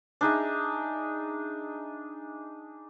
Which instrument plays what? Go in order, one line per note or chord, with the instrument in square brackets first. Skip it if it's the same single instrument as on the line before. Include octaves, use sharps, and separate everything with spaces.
[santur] D4 D#4 G#4 E5